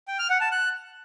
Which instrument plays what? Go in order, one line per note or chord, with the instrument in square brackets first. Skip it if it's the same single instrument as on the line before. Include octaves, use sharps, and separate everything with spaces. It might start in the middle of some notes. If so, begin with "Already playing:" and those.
[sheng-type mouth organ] G5
F6
F#5
A5
F#6